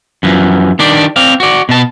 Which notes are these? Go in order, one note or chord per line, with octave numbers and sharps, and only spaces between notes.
F#2 E3 F3
D#3 D4 G4 D5
C4 D5 F5
F#4 D5
B2 A5